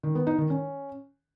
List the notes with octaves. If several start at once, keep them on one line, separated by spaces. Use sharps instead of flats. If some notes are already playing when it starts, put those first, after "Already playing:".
D#3
B3
D#4
D#3
C#4